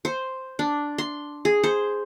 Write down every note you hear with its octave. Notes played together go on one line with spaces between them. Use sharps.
C5
D4
C6
G#4
C5